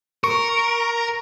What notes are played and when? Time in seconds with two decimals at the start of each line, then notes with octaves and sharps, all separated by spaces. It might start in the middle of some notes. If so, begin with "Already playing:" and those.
0.24 A#4 C#6